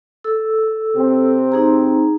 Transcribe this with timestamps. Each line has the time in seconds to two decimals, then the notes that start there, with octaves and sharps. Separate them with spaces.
0.24 A4 E6
0.97 C3 C4
1.52 D#4 G#4 A#5